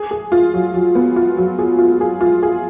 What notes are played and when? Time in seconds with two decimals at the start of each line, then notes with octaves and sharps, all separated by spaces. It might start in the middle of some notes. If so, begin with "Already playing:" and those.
Already playing: G#4
0.11 G#4
0.32 F4
0.54 F#3
0.74 F#3
0.95 B3
1.16 F4
1.37 F#3
1.59 G#4
1.79 F4
2.01 G#4
2.21 F4
2.43 G#4